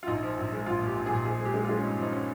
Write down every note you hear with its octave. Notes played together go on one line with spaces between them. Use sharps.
F4
A#1 D#4
F3
A#1
G#3
A#1 F4
A#2
G4
A#1
A#2 G#4
F3 G#4
G#3
G4
G#3
G#3 F4
C#4
G2 D#4
F3 D#4
C#4